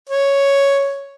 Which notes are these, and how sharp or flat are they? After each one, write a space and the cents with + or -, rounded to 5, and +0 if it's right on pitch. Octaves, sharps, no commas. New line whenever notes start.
C#5 +0